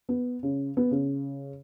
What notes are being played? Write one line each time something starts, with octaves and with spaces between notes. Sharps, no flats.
B3
C#3
B3
C#3